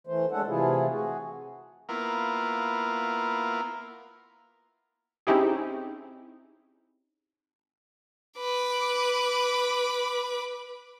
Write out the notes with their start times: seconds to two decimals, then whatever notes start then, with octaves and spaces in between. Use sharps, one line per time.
0.07 E3 A3 C5
0.31 G#3 C#4 D4 A4 F#5
0.47 C3 E3 A3 E4 F4 G#4
0.90 F#4 G#4
1.89 A#3 B3 E4 F4 A#4
5.27 C4 C#4 D#4 E4 G4 G#4
8.37 B4 D6